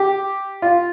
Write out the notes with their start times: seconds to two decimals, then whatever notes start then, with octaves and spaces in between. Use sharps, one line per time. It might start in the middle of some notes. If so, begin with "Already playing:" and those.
Already playing: G4
0.62 F4